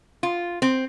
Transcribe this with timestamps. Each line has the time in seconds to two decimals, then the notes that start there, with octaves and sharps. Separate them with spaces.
0.23 F4
0.62 C4